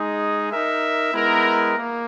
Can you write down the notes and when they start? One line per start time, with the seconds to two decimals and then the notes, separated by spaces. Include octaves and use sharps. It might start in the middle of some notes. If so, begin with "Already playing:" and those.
Already playing: G#3 D#4 G#4
0.51 D#4 A#4 E5
1.13 G#3 B3 E4 A#4
1.77 A#3